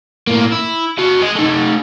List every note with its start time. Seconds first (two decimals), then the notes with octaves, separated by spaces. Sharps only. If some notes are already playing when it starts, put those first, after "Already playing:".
0.27 A2 A#3
0.52 E4
0.99 F#4 A5
1.22 G#4 D#5
1.36 A3 D#4